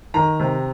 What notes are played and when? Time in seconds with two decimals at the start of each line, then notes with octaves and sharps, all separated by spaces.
0.14 D#3 A#5
0.40 C3